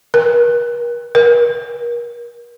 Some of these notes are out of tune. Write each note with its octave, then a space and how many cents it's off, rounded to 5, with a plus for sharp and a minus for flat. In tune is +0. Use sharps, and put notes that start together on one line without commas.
A#4 +40
A#4 +35